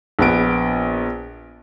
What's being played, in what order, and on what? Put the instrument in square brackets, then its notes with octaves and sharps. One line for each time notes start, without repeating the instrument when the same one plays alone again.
[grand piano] A#1 B3 D7